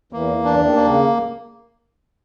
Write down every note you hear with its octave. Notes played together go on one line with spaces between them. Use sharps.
E2 E3 A#3
E2 E3
D4
D#2 D#3
A#3
C#3
D3